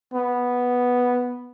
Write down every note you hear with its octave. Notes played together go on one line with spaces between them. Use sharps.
B3